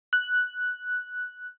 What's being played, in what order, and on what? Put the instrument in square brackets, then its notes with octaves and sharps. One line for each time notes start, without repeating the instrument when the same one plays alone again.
[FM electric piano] F#6